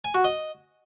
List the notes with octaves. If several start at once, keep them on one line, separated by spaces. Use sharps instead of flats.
G#5
F#4
D#5